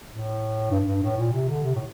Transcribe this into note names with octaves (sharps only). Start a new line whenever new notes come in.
A2
G2
G2
A2
A#2
C3
D3
C3
A2